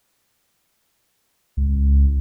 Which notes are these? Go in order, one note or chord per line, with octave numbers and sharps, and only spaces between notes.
C#2